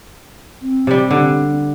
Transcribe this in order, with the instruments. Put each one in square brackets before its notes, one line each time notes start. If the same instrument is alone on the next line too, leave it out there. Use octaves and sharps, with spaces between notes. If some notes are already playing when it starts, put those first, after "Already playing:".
[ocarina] C4
[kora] C3 G3
D3